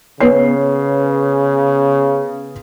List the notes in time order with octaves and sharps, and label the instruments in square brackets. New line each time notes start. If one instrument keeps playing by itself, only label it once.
[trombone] C#3 [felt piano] B3 C#5 C7